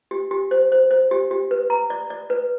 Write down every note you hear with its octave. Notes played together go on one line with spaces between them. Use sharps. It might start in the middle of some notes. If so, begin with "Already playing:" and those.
G4
G4
C5
C5
C5
G4
G4
B4
A#5
D5
D5
B4